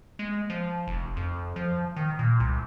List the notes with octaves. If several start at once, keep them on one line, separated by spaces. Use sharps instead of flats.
G#3
F3
F1
F2
F3
D#3
A#2
C2